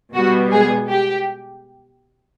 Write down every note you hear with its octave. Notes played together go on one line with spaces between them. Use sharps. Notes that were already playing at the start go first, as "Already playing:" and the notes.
B2 G3 B3 F#4
G#3 G#4
G4